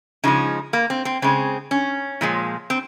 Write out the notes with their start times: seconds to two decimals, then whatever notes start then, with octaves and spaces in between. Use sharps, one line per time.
0.24 C#3 F3 G#3 D#4
0.73 A#3
0.90 C4
1.05 C4
1.22 C#3 G#3 C4
1.71 C#4
2.21 A#2 F3 G#3
2.70 C4